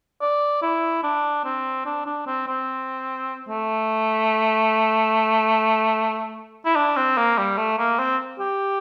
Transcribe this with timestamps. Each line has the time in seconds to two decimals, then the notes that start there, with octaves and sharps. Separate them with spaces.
0.21 D5
0.62 E4
1.03 D4
1.44 C4
1.85 D4
2.06 D4
2.26 C4
2.47 C4
3.49 A3
6.65 E4
6.76 D4
6.96 C4
7.17 A#3
7.37 G3
7.57 A3
7.78 A#3
7.99 C4
8.39 G4